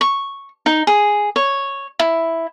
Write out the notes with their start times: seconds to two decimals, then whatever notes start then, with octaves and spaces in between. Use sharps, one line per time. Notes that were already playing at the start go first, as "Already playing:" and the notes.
0.01 C#6
0.66 D#4
0.87 G#4
1.36 C#5
1.99 E4